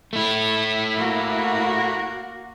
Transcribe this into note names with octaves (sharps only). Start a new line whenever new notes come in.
A3 E4
A#3 F#4